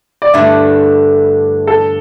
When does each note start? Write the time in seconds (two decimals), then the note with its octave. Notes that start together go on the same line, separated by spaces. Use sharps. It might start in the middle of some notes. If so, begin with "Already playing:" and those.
0.22 D5
0.34 G2 D3 A3 E4 E5
1.67 A4